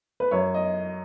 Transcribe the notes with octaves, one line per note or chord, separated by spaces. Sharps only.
B4
F#2 C#5
D#5